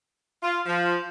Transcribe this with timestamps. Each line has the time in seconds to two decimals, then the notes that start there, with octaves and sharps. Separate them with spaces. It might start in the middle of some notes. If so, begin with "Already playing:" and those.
0.43 F4
0.66 F3